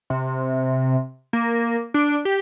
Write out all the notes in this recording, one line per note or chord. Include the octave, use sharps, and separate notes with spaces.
C3
A#3
D4
G4